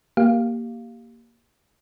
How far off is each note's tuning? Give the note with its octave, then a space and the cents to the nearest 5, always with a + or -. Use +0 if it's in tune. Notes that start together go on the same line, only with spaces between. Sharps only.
A#3 +0 G4 -5 F5 +0